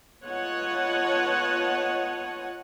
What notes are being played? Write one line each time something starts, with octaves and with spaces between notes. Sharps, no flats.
B3 F4 C#5 D#5 F#5 A5